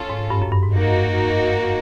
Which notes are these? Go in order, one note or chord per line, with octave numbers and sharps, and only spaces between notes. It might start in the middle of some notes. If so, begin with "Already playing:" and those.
Already playing: C#4 F4 A4
G#2
G2
F#2
G2
G#2
A#3 D#4 F#4